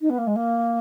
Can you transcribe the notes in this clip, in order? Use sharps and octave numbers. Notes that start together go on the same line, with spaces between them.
D#4
B3
A#3
G#3
A#3